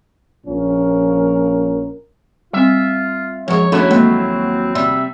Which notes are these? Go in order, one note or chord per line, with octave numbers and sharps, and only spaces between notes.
A#1 A#2 F3 C#4 A#4
G3 C4 F4 E5
F#2 F3 G#3 G#4 A#4 C#5
D#2 A3 C#4 D4 E4 F#4
F#3 G#3 A#3 C4
C3 G3 D5 E5